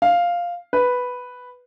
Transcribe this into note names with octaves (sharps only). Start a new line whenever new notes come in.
F5
B4